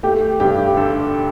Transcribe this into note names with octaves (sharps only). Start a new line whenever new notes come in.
A3 G4
G2 G4
D3 A4